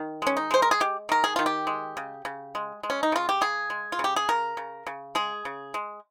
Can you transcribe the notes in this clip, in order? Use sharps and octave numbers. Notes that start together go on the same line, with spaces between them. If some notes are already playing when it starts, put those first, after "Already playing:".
Already playing: D#3
G#3 C#4
D#4
G#3 C5
A#4
G#4
G#3 G4
D#3 A#4
G#4
D#3 F4
G4
G#3
C#3
C#3
G#3
G#3
C#4
D#4
C#3 F4
G4
C#3 G#4
G#3
F4
C#3
G4
G#4
C#3 A#4
C#3
C#3
G#3 G#4
C#3
G#3